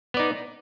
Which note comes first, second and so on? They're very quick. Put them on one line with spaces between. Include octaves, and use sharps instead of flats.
B3 D5 D#4